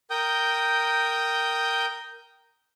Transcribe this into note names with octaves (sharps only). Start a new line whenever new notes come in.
A#4 G5 D#6 G6